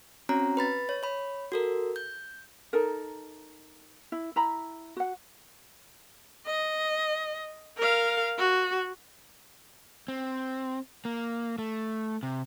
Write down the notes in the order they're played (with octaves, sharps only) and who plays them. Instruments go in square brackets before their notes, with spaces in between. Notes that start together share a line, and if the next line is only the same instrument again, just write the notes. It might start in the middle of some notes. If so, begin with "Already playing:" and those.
[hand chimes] C4 C#4 F#4 C#5 A#5
B4 B5 A6
C#5
C#5 B5
F#4 A4 A#4
G6
[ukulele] D#4 A4 A#4
E4
E4 A#5 B5
F#4 F#5
[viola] D#5
A#4 F5
F#4
[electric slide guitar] C4
A#3
A3
C3